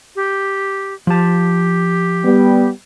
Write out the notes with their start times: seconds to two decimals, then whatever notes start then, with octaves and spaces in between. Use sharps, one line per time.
0.16 G4
1.07 F3 G4 A5
2.25 G3 B3